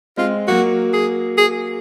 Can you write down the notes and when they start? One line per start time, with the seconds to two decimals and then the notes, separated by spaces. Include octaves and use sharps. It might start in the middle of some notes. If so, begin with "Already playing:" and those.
0.17 G#3 C4 F4
0.48 F#3 A#3 F#4
0.93 G#4
1.38 G#4